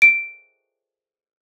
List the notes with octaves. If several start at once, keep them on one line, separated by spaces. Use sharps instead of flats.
D7